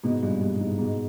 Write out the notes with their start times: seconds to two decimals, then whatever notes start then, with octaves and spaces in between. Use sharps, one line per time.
0.04 G#2 B2
0.23 G2 A#2
0.41 G2
0.60 G#2
0.79 G#2 B2